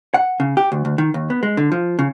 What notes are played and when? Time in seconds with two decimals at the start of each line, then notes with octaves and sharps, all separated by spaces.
0.14 F#5
0.40 C#3
0.57 G4
0.72 D2
0.85 D2
0.98 D#3
1.14 D#2
1.30 B3
1.43 G#3
1.57 D3
1.72 F3
1.99 C#3